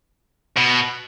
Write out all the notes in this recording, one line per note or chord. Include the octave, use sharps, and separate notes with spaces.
B2